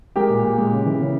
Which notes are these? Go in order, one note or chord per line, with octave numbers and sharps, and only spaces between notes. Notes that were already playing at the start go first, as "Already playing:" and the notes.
G#3 G4 A#4
A#2
A#2
G#3
C#3
E3
C#3